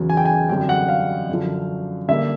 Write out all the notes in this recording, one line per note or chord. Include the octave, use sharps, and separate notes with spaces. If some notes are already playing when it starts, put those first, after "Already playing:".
Already playing: E2 C#3 F#3
G#5
G5
G#5
F#2 D3 G3 C4 G5
F#5
F5
F#2 D3 F3
D3 G3 A#3 E5